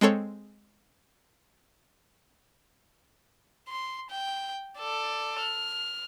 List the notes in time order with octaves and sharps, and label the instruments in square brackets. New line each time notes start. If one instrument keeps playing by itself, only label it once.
[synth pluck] G#3 C4 A4 C#5
[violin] C6
G5
A4 D5
F6